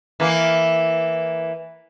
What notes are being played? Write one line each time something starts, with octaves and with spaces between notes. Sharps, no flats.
E3 A#3